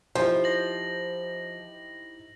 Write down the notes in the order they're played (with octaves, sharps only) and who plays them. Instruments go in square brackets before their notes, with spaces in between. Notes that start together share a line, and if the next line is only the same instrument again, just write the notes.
[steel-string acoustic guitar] F3 [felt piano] D#4 E4 G4 [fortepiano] C5
[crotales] A#6 F#7